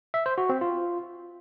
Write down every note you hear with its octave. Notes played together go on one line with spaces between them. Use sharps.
E5
C5
F#4
C4
F4